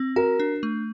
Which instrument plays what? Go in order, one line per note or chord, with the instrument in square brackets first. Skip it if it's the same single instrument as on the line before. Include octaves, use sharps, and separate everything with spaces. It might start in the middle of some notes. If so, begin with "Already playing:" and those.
Already playing: [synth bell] C4
[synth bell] F#4 [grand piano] A#4
[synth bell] D4
A3